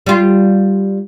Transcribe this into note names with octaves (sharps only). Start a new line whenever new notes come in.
G3 F4